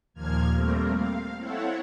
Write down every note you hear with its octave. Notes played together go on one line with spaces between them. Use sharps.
D#2 A#2 F3 A#3 F6 G#6
G3 A3 A#3 C4 A#4
F5
C4 E4 A4 C#5 F#5